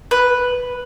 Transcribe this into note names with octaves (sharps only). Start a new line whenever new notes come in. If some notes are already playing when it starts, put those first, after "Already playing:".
B4